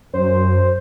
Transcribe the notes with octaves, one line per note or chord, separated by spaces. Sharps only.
F#2 C5